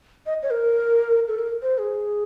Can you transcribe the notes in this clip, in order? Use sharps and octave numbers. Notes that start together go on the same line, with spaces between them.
D#5
C#5
A#4
A4
A#4
C5
G#4